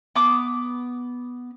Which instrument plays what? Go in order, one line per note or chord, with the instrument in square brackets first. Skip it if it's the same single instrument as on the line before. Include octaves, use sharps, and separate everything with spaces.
[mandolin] B3 D6